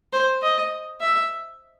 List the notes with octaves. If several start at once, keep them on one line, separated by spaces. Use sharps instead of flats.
C5
D#5
E5